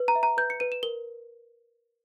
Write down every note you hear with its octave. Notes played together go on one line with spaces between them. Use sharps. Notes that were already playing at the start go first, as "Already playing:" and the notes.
Already playing: B4
A#5
E5
A#5
B4 G6
C#7
B4 D#7
E7
A#4 G7